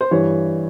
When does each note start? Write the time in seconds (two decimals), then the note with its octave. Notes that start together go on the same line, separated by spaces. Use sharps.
0.01 C5
0.11 G2 E3 C#5